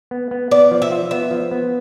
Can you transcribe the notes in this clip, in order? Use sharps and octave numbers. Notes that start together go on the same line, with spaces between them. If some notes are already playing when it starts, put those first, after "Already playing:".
B3
B3
B3 D5
F3
E5
F4
B3 E5
F3
B3